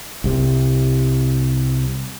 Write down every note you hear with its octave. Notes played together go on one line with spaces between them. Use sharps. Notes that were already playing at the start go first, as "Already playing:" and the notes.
C2 C3